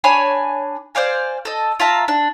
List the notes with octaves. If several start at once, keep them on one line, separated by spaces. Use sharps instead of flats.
D4 C#5 G#5 B5
C5 D5 F5 G#5
A4 D#5
F4 E5 A5 A#5
D4